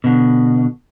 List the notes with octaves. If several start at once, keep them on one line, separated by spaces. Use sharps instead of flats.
B2 D3